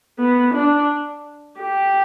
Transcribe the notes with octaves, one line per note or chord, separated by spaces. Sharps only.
B3
D4
G4